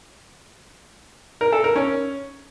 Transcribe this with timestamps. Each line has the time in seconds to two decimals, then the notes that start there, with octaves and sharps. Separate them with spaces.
1.41 A#4
1.52 A4
1.64 A#4
1.76 C#4